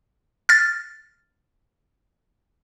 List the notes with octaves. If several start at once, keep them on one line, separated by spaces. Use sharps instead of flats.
F6 A6